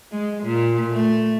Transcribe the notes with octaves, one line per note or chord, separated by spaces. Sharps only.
G#3
A#2
A3